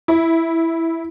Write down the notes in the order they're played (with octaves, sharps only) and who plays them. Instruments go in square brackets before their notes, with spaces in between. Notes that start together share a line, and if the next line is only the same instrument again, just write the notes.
[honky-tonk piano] E4